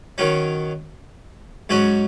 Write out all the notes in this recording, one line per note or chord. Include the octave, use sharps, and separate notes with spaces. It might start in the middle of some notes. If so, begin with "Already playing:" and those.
D#3 F#3 C#4
G#2 F#3 C#4 F#4